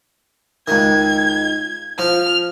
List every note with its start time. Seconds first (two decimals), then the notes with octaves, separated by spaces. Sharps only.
0.68 C#2 D#3 G#6
1.99 F3 F6